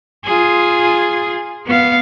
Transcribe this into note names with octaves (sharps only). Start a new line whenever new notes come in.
F4 G#4
B3 F5